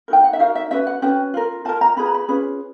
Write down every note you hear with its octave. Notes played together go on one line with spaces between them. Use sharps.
D#4 F#4 A#4 G5
F#5
E5
D#4 F#4 A#4 F5
E5
C#4 F#4 B4 E5
F#5
C#4 F#4 B4 G5
F4 A#4
F4 A#4 A5
A#5
C#4 F4 G#4 B4 B5
A#5
B5
C#4 F4 G#4 B4